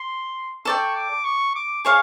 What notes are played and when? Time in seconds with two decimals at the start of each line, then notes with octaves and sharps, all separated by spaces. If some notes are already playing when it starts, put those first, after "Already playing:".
Already playing: C6
0.65 A4 D5 G5 C#6
0.95 D6
1.24 C#6
1.55 D6
1.85 G#4 C#5 F5